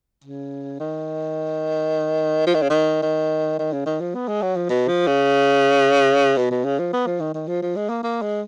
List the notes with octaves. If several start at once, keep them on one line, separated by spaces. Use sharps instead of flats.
C#3
D#3
F3
D#3
C#3
D#3
D#3
D#3
C#3
D#3
F3
B3
G#3
F#3
F3
B2
F3
C#3
B2
B2
C#3
F3
B3
F3
D#3
D#3
F3
F3
G#3
A#3
A#3
G#3